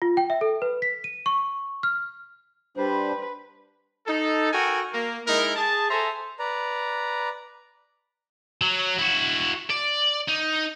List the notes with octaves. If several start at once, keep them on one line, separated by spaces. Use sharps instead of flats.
F4
G5
E5
A4
B4
B6
D#7
C#6
F6
G3 D4 B4 C5
D#4 A4
F#4 A4 A#4 G5 G#5
A#3
G#3 D#4 E4 A#4
G#4 A5
A4 C5 E5 G#5 A#5
B4 D5 A#5
F#3
E4 F#4
D5
D#4